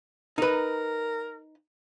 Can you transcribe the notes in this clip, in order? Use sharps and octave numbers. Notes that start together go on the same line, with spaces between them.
D#4 A#4 B4